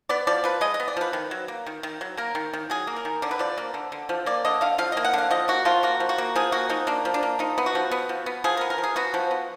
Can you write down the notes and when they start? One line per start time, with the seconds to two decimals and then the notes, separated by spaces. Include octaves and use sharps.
0.09 B3 D5
0.27 F3 D5
0.44 F3 B4
0.61 G#3 D#5
0.74 D#5
0.80 B3
0.88 D5
0.97 F3 B4
1.13 D#3
1.31 F#3
1.48 A#3
1.66 D#3
1.83 D#3
2.01 F#3
2.17 A#3 A#4
2.35 D#3
2.53 D#3
2.70 F#3 G#4
2.87 A#3
2.96 A#4
3.05 D#3
3.22 D3 D5
3.31 B4
3.39 F3 D5
3.58 A#3
3.74 D3
3.92 D3
4.09 F3
4.26 A#3 D5
4.45 D3 D#5
4.61 D3 F5
4.78 F3 F5
4.92 A#3 D#5
5.04 F#5
5.13 D3 F5
5.31 F3 D#5
5.48 A#3 F#4
5.65 F3 F4
5.83 A#3 F#4
6.00 F3
6.09 F#4
6.18 A#3
6.35 F3 G#4
6.52 A#3 F#4
6.69 F3 D#4
6.87 A#3 D4
7.05 F3
7.14 D4
7.23 A#3
7.39 F3 D#4
7.58 B3
7.66 F#4
7.75 F3
7.91 B3
8.09 F3
8.26 B3
8.44 F3 G#4
8.57 B3 A#4
8.70 A#4
8.78 F3
8.83 G#4
8.96 B3 F#4
9.14 F3
9.31 B3